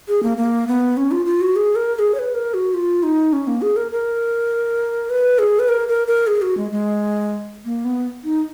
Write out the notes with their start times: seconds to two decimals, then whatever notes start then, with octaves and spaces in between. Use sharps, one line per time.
0.08 G#4
0.23 A#3
0.37 A#3
0.68 B3
0.97 C#4
1.11 F4
1.26 F4
1.41 F#4
1.56 G#4
1.76 A#4
1.95 A#4
1.99 G#4
2.15 C#5
2.19 B4
2.34 A#4
2.54 F#4
2.74 F4
3.03 D#4
3.33 C#4
3.47 A#3
3.62 G#4
3.76 A#4
3.92 A#4
5.10 B4
5.39 G#4
5.59 B4
5.68 A#4
5.88 A#4
6.07 A#4
6.27 G#4
6.42 F#4
6.57 G#3
6.71 G#3
7.65 A#3
7.85 B3
8.24 D#4